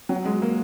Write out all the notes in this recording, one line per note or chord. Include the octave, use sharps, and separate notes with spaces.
F#3
G#3
A#3